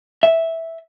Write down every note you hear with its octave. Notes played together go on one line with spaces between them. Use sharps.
E5